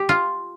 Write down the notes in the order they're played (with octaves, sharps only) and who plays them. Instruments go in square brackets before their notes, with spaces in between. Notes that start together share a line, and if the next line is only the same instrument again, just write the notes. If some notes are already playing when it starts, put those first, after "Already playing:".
Already playing: [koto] G4
F4